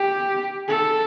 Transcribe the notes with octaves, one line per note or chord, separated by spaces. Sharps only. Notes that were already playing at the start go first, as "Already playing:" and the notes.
Already playing: G4
A4